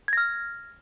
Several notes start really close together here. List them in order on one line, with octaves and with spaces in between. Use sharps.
G#6 A#6 F6